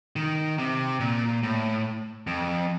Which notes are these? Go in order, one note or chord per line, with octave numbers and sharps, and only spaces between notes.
D#3
C3
A#2
A2
F2